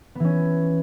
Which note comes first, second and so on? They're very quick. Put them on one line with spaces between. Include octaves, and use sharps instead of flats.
B3 E3 C#4